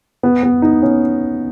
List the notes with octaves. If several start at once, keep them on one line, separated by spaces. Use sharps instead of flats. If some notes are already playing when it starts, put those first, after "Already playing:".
B3
B3
D#4
C#4